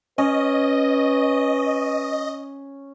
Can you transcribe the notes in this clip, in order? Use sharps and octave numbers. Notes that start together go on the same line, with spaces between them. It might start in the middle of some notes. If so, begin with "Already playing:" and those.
C#4 B4 D#5